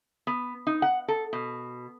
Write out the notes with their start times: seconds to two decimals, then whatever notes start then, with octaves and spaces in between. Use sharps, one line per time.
0.27 B3
0.67 D#4
0.82 F#5
1.08 A4
1.33 B2